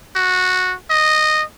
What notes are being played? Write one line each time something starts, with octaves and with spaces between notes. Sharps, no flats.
F#4
D#5